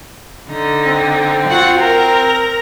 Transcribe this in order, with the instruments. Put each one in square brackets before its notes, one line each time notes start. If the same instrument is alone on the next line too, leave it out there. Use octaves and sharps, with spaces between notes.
[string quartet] D3 D#4
[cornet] C4
[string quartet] F4 F#4 F#5
A#4 A#5